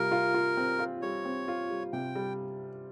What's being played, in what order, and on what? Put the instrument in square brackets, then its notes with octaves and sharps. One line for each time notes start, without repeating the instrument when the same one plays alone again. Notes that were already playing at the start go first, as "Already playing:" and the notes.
Already playing: [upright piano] C3 G3 F4 [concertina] A#4
[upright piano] F4
F4
C4
F4
[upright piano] G3 [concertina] C#5
[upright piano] C4
F4
G3
[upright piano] C3 [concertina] G5
[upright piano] G3